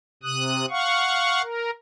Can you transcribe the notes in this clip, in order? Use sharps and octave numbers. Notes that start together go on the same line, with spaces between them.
C3 D#6 F#6
F5 F#5 C#6
A#4